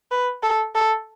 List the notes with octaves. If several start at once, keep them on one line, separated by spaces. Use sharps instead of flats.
B4
A4
A4